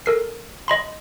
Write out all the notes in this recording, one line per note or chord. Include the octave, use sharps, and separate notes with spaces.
A4 A#4 C7
D#5 B5 C6